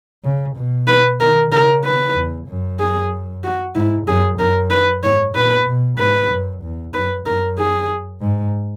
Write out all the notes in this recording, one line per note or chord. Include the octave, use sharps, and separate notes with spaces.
C#3
B2
B4
D#3 A#4
C#3 A#4
B4
E2
F#2
G#4
F#4
G#2 E4
F#2 G#4
F#2 A#4
B4
G#2 C#5
A#2 B4
B2
G#2 B4
F#2
E2
F#2 B4
F#2 A#4
G#4
G#2